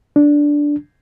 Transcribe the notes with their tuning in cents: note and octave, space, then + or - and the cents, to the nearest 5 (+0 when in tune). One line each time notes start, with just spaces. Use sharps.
D4 -5